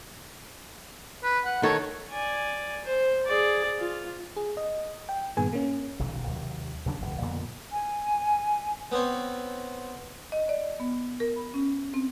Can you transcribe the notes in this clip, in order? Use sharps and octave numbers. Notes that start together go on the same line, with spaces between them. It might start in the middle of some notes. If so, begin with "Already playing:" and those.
B4
F#5
D#3 A4 C#5
D5 G#5
C5
G#4 D5
F4
G#4
D#5
G5
G2 A#2 D#3 B3 G#4 G#5
A#3 C#4
F1 B1 D#3
D#2 C3 F#3
D#2 C#3 F#3 D4
E1 C#2
F2 A#2 D3 B3
G#5
B3 C4 C#5
D#5
D5
B3
A#4
B5
C#4
C4